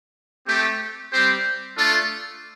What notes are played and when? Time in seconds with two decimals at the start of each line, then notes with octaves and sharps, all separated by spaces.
0.46 A3 C4 G4
1.11 G3 C4 G4 C5
1.76 A3 D4 F4 A4